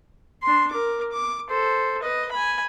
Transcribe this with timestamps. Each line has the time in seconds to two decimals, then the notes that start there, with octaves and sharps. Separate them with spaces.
0.42 D4 C6
0.71 A#4 D6
1.12 D6
1.49 A4 C5
2.02 B4 D#5
2.31 G#5 B5